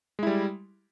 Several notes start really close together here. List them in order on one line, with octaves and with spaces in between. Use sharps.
G#3 E4 G3